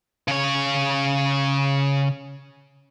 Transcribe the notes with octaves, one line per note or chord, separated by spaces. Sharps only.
C#3 C#5